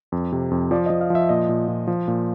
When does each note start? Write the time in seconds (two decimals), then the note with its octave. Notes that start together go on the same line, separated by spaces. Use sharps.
0.12 F2
0.32 C3
0.51 F2
0.71 F3 D5
0.86 D#5
0.90 F3
1.01 F5
1.10 F3 E5
1.29 A#2 D#5
1.49 A#2
1.68 A#2
1.87 F3
2.08 A#2